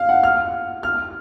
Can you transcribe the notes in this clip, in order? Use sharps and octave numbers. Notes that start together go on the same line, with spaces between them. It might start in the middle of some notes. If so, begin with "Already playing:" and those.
Already playing: F5
F#5
F6
F6